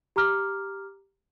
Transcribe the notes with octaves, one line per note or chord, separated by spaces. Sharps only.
G4 A#5 D6 F6